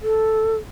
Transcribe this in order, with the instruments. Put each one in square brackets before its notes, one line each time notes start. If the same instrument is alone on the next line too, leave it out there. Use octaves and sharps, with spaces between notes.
[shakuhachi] A4